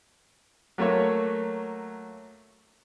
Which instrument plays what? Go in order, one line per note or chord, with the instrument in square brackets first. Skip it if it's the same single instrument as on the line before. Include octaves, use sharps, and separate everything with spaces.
[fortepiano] F#3 A3 A#3 C#5